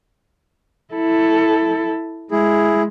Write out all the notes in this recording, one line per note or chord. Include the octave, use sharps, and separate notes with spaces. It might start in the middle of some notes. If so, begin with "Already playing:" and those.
E4 A4
G#3 E4 G#4